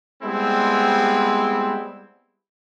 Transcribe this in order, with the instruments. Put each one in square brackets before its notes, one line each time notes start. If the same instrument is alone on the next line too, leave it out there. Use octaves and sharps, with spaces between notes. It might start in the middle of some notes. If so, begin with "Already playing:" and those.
[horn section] G3 G#3 B3 C4 E4